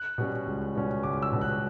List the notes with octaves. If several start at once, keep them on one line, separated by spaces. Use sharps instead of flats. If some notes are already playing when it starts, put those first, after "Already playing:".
Already playing: F#6
B2 G3 C#4
C#2
B2 G3 C#4
C#2 D6
E6
B2 G3 C#4
F#6